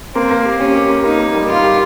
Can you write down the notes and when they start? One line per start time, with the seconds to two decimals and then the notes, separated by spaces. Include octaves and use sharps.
0.15 A#3 C4
0.30 A#3
0.45 G4
0.60 C#4 G4
0.75 G4
0.89 A#3
1.04 A#3 D#4
1.19 A#3
1.34 G3
1.49 A#3 F4
1.63 G4